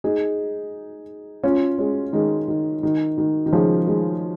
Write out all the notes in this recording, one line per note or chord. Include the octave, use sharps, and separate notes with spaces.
D#4 G#4
C#4 F4
G#3 C#4
D#3 G#3
D#3
D#3
D#3
D#3
C#3 F3
D#3 G#3